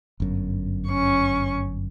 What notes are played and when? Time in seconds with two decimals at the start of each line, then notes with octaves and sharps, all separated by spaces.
0.20 G1 F#2
0.88 C#4 C#6